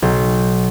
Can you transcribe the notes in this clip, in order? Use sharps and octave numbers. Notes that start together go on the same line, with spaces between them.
B1